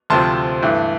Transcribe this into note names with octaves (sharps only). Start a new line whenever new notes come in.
D2 C3 F3 C4 A5 C6
G2 E3 A3